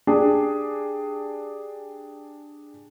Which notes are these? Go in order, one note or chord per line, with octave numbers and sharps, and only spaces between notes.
D4 G4 G#4